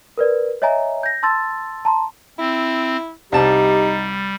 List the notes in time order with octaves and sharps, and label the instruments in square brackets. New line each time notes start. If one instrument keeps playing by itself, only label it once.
[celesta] A#4 B4 D5
C#5 D#5 E5 G#5 A#5
G6 A#6
A5 C6 E6 A6
A5 A#5 C6
[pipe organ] C4 [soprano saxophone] E4
[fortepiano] C2 A5 [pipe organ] G3 [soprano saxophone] D#4 [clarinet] G4